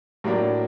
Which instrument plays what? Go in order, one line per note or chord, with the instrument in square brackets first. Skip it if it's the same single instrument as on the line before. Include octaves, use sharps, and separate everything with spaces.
[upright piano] A2 F#3 A#3 D4